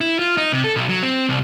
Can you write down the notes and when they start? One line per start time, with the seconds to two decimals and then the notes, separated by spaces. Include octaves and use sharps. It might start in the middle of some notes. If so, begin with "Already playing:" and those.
0.01 E4
0.19 F4
0.37 D#4
0.52 C3
0.64 A4
0.76 B1
0.89 F#3
1.03 C4
1.29 C2